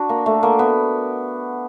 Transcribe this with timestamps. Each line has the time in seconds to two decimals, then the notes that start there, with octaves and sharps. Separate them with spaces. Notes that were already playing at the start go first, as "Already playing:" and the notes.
Already playing: D4 F#4
0.09 A#3
0.26 A3
0.43 A#3
0.59 B3